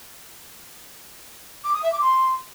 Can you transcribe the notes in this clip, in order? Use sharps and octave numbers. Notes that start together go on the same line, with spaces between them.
D6
D#6
E5
D6
C6